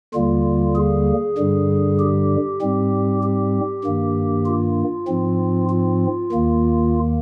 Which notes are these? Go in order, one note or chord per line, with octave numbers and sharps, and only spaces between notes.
D#2 D3 G3 A#3 F4
G#4
G2 D3 G3
G4
G#2 G3 C4
G4
G2 D#3 A#3
F4
G#2 F3 C4
F4
D#2 D#3 A#3